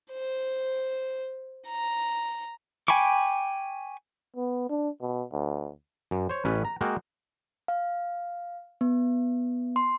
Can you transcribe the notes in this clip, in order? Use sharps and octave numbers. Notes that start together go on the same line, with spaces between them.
C5
A#5
G5 G#5 B5 C#6 D6
B3
D4
B2
D2
F#2
C5 C#5
A1 C#4 B4
A#5
G#3 A#3 F#4 F5 G5
F5
B3
C6